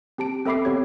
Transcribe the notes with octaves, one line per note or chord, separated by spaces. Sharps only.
C4 G4 A5 D7
C4 A4 E5 B5 D6 C7
B3 C4 G4 C#5 G#6